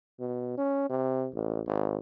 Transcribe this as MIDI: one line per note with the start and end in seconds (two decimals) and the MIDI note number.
0.20 0.56 47
0.57 0.89 61
0.89 1.28 48
1.34 1.61 33
1.67 1.99 32